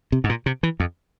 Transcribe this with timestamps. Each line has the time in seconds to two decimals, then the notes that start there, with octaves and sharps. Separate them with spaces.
0.12 C3
0.24 G#2
0.29 A#2
0.46 C3
0.63 E3
0.80 F2